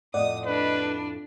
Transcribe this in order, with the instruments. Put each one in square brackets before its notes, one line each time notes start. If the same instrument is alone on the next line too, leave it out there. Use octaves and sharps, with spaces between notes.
[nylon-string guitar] F2 A2 F#5 [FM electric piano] D5 D#5 [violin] D#6
[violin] D4 [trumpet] B4